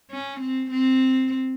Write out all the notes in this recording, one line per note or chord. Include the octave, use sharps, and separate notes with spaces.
C#4
C4
C4